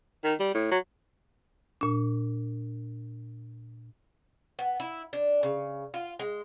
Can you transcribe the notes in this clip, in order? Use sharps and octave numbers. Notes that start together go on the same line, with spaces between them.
D#3
G3
A2
F#3
A#2 D4
B3
E4
D4
C#3
F4
G#3